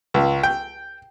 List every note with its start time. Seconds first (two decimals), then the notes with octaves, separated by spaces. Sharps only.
0.14 C#2
0.43 G5